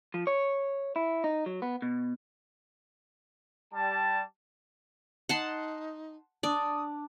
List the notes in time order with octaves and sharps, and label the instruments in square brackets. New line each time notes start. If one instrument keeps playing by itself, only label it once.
[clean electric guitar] F3
C#5
E4
D#4
F#3
B3
B2
[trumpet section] G3 A5
[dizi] D#4 [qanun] F#5 A5 C6
[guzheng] D4 [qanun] D5 [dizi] D#6